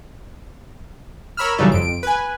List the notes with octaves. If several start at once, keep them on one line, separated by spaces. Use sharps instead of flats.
A#4 C#5 B5 E6 F6
C#3 E3 F#3 G3 D#4 A4
F2 D7
B4 G#5